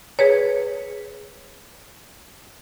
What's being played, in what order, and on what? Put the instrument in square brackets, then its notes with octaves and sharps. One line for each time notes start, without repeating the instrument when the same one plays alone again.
[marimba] G#4 B4 C#5